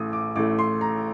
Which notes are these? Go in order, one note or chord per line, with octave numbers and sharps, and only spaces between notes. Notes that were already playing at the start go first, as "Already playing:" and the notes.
Already playing: A1 A2 A3 D#6
D6
A1 A2 A3 D6
C6
A#5